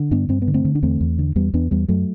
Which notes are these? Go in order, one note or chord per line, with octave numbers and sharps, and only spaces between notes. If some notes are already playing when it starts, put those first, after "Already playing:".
Already playing: D3
G2 B3 D4
G2 C4
B3
D3
A3 C4
D3
D4
E2 A3 C4
E2
D3
E2 G3 B3
E2 B3 D4
E2 G3 B3
F#2 F#3 A3